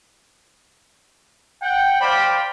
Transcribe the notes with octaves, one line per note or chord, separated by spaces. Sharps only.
F#5 G5
C5 D5 F5 G5 B5